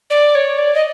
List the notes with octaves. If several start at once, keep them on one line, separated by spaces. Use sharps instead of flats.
D5
C#5
D5
D#5